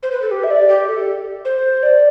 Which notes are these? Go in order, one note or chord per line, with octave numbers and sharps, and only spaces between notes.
C5
B4
A4
G4
E5
D5
G4
A4
C5
D5